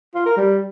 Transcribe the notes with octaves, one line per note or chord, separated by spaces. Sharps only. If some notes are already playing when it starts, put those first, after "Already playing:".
F4
A#4
G3